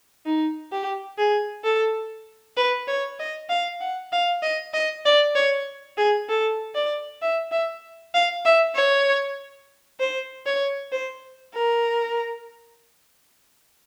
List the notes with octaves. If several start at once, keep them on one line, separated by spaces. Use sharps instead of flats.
D#4
G4
G#4
A4
B4
C#5
D#5
F5
F#5
F5
D#5
D#5
D5
C#5
G#4
A4
D5
E5
E5
F5
E5
C#5
C5
C#5
C5
A#4